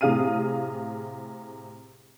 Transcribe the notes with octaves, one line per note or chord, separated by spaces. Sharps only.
A2 C3 G#4 F5 F6 D#7